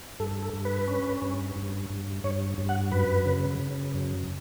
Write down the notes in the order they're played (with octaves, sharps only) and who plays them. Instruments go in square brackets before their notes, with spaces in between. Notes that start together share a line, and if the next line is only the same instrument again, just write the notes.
[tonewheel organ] G2 A4
A4
G2
B4
C#4
G2
G2
G2
G2 C#5
G2
F#5
F#2 B4
C#3
C#3
F#2